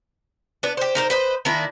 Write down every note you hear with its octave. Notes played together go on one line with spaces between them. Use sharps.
B3 D4
G4 C5
D#4 A#4 C5
B4 C5 D#5
D#3 A#3 D4 E4